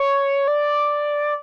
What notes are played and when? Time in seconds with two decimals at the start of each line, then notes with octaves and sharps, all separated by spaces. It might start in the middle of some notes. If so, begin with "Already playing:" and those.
Already playing: C#5
0.48 D5